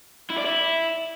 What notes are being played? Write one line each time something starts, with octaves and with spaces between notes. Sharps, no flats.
E4
D5
E4